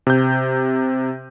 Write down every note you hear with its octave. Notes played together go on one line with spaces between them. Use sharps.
C3 G6